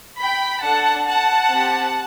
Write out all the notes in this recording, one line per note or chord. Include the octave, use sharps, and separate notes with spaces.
G5 B5
D4 A4 F#5 A5
F#5 A5
C4 G4